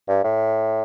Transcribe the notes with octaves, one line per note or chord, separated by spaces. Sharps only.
G2
A2